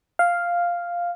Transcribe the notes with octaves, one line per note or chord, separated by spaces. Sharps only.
F5